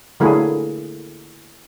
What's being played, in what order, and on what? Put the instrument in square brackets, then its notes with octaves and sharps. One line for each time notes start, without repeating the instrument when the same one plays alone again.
[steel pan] D3 F#3 A3 A#3 E4 G#4